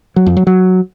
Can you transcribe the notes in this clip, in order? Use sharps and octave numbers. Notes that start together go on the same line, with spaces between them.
F#3
F2
F#3
F#3